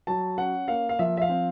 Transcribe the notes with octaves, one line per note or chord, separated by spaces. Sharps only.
F#3 A5
C#4 F#5
A#3 F5
F5
F3 E5
E5
F5
C4